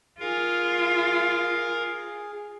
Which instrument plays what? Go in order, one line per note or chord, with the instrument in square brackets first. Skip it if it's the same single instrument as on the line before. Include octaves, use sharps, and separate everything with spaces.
[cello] F4 [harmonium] G#4 [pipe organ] A#4 F5